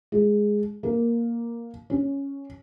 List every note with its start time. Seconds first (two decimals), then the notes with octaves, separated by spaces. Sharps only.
0.12 G#3
0.83 A#3
1.90 C#4